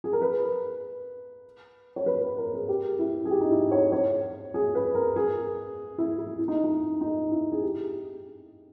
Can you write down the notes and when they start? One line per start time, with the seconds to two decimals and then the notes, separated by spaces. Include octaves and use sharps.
0.04 G#4
0.13 A#4
0.22 B4
1.96 C#5
2.06 B4
2.21 B4
2.38 A#4
2.53 G#4
2.69 G4
2.99 E4
3.25 G#4
3.30 G4
3.41 D#4
3.51 E4
3.71 C#5
3.92 C#5
4.54 G#4
4.75 B4
4.95 A#4
5.16 G#4
5.98 E4
6.18 E4
6.39 E4
6.48 D#4
6.64 D#4
7.01 D#4
7.31 E4
7.52 G#4
7.63 G4